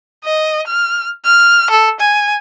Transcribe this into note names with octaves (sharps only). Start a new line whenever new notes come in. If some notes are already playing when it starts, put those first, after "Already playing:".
D#5
F6
F6
A4
G#5